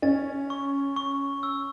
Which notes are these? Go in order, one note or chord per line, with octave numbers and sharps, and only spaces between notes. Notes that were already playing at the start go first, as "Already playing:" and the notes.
C#4 A6
C#6
C#6
E6